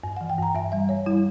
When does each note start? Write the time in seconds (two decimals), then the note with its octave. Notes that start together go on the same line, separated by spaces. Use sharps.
0.04 G2
0.17 E3 F#5
0.30 G5
0.38 G2 A#5
0.55 G2 E5
0.72 G3 E5
0.89 G2 C#5
1.06 G3 E4